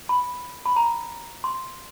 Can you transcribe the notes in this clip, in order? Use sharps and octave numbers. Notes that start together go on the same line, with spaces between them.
B5
B5
A#5
C6